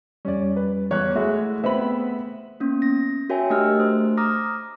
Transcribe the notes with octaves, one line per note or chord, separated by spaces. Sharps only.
F2 G3 C#4 D5
B4
E2 C#5 F#6
G#3 A3 E4 F#4
B3 C4 C5 E5 B5
A#3 B3 C#4
A#6
F#4 A#4 C#5 E5 G5 G#5
A3 D4 G4 D#5 E6 F6
A3 C5
A#5 D6 D#6 F6 A#6